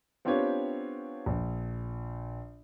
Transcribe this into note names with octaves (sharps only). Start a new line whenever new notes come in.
B3 C4 D4 F4 G4 C#5
A#1